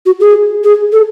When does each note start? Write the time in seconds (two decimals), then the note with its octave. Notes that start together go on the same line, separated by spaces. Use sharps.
0.06 F#4
0.20 G#4
0.64 G#4
0.92 A4